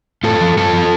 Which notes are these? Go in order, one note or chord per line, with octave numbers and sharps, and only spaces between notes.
A2 F4 A4
F3
G2 F4 A4
F3